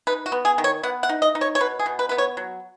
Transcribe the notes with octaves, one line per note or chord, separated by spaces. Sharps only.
D#4 B4
F#4
B3
G#4
D#3
C#5
B3 F#5
F#5
D#4
D#5
D#4
C#5
C#5
B2 B4
G#4
B2
B4
B3 B4
C#5
F#3